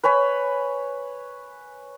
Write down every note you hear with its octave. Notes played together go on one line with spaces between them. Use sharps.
B4 C#5 G#5 B5